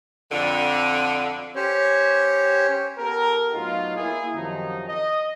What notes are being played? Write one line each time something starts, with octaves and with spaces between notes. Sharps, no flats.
F2 D3
C#4 G4 C5 C#5
B3 G4 A4 A#4
A2 F#3 B3 D#4 F4
A#3 E4 G#4
F#2 C3 D#3 F3 D#4
D#5